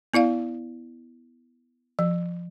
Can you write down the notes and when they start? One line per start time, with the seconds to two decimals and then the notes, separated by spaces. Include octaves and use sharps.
0.14 B3 E4 D5 F5
1.99 F3